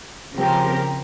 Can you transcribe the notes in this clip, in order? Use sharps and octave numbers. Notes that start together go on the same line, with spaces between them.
C#3 F3 C4 G4 A#4